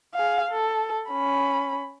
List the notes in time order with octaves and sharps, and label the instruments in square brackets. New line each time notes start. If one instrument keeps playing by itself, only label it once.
[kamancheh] G#4 F5
A4
C#4 B5